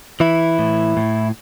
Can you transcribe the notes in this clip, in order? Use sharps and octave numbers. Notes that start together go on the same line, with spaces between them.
E3 E4
A2
A2